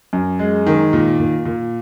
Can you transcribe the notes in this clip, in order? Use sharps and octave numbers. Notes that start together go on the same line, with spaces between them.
F#2
G#3
D#3
A#2
A#2
A#2